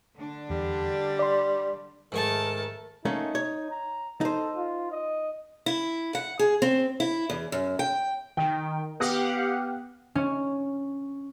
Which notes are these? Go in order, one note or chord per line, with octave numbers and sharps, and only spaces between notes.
D3 D4
E2 G3
D5 C6
G#2 D#3 A3 A#4 G#5 A5
A3 A#3 C#4 D#4
C#5
A#5
D#4 A4 C5
F4
D#5
E4
F#5
G#4
C4
E4
E2
F#2
G5
D#3 G5
B3 G4 F5 F#5 D#6 A#6
C#4